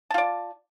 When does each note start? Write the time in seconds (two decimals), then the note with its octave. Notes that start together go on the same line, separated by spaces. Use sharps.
0.10 A5
0.14 F4
0.18 D5